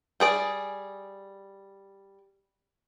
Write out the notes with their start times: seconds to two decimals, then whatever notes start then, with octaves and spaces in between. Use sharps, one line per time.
0.20 G3 G#4 D5